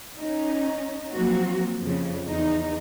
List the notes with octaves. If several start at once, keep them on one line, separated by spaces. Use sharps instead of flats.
C#4 D#4
F3 F#3 A#3 C4 F#4
F2 C#3
E2 D#4